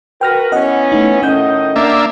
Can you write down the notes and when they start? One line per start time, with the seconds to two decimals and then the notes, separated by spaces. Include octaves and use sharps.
0.21 F#4 A#4 B4 G5 F6 A#6
0.52 E3 B3 C#4 D#5 F#5
0.92 A3 D#4
1.22 A2 D#3 C#4 D#5 F#5 G6
1.76 A#3 D4 E5